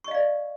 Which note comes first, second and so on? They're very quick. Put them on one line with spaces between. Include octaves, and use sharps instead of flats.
C#6 D#5 F5 D5